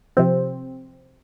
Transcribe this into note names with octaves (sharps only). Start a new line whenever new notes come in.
C3 F3 C4